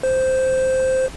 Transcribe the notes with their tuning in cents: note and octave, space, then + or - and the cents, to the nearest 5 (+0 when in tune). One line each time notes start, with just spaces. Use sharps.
C5 -5